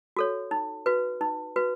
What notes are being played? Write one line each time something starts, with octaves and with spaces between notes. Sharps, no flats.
F#4 A4 C#5
D#4
F#4 B4
D#4
F#4 B4